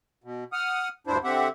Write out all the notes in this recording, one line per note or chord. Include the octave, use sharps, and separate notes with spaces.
B2
F#5 D#6 F6
D2 G2 D4 E4 C5
D3 C4 G4 E5 F#5